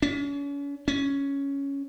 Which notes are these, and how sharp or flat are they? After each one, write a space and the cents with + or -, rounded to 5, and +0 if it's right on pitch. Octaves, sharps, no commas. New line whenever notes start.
C#4 +40
C#4 +5